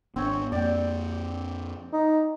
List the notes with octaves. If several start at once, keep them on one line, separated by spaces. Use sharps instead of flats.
G#1 B3 C4 D4 C#5
F2 A#3 D5 G5
D#4